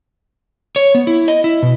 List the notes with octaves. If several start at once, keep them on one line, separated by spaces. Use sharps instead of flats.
C#5
B3
E4
D#5
E4
B2